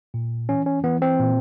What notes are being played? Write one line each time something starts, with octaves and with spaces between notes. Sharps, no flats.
A#2
E3 C#4
C#4
E3 B3
C4
A#2